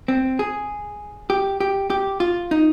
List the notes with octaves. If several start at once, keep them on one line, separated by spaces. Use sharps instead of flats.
C4
G#4
G4
G4
G4
F4
D#4